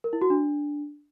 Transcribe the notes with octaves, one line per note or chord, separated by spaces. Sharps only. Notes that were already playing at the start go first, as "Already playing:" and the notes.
A#4
E4
F#4
D4